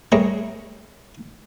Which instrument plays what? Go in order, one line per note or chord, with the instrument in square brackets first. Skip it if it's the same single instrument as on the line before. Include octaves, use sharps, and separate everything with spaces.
[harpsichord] G3 A3 G#4 A#4 C#5